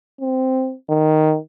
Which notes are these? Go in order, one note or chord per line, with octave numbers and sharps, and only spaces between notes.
C4
D#3